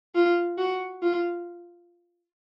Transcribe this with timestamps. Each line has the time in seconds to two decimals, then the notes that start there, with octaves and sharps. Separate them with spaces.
0.15 F4
0.58 F#4
1.02 F4